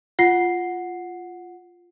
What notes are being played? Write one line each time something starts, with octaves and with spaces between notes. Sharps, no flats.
F4 F#5 C7